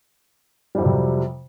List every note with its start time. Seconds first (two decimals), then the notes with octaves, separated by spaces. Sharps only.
0.75 G3
0.78 F2
0.82 F#3
0.85 C3